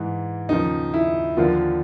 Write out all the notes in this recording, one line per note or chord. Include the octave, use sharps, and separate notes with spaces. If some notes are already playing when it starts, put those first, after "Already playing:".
Already playing: G#2 E3
D#2 C#3 F3 D#4
E4
D#2 D3 F3 F4